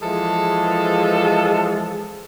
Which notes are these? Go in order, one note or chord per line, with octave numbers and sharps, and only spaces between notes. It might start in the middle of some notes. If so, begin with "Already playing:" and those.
E3 F3 G#3 G#4 A4